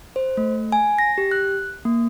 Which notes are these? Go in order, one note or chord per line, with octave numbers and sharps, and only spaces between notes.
C5
A3
G#5
A#6
G4
F#6
A#3